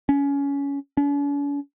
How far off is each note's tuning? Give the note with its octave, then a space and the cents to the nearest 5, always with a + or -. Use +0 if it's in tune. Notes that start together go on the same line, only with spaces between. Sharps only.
C#4 +20
C#4 +45